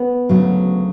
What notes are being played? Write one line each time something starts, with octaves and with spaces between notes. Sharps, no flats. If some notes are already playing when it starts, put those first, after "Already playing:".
Already playing: B3
D2 C#3 F#3